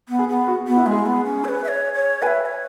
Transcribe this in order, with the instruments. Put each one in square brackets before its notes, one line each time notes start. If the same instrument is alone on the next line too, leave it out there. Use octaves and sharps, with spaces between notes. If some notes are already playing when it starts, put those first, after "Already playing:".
[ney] B3
[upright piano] G#4
[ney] B3
[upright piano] F#4
[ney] B3
[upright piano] E4
[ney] G#3
[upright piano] G#4
[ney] B3
C#4
C#5
B4
E5
C#5
C#5
[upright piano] B4 [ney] G#5
[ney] E5
E5
C#5